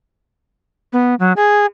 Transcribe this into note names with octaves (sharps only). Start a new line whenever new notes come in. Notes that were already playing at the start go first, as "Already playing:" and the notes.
B3
F#3
G#4